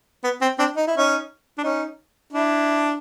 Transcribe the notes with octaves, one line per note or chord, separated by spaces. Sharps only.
B3
C4
C4 D4
D#4
E4
C#4 D#4
D4
C#4 D#4
D4 E4